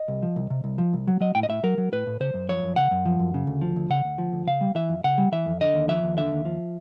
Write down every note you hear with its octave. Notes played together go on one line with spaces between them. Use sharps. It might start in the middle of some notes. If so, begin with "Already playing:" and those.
Already playing: D#5
C2
F3
C2
C3
C2
F3
C2
F#3
F#3 D#5
A2 G5
D#5
A2 E5
F#3 A#4
F#3
A2 B4
A2
C#3 C5
F#2
F3 C#5
F#2
C#3 F#5
F#2
F3
F#2
C#3
D2
F3
D2
C#3 F#5
D2
F3
D2
C#3 F5
G3
E3 E5
F2
C#3 F#5
G3
E3 E5
F2
D3 D#5
D#2
F3 E5
D#2
D3 E5
D#2
F3